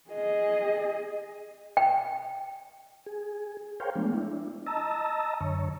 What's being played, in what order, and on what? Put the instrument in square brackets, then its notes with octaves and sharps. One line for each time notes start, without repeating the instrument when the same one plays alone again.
[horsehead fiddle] G#4 D#5
[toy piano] G5
[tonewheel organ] G#4
G#4 A#4 C5 C#5 F5 G5
F3 G#3 A3 B3 D4
D4 E4
D#5 A5 A#5 E6
F#2 D3 C#5